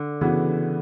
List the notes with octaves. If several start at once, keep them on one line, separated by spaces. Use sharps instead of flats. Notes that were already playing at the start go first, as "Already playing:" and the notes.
Already playing: D3
C#3 E3 B3 F#4